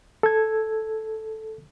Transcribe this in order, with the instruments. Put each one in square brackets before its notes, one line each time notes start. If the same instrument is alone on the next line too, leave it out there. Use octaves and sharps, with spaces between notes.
[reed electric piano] A4 G#6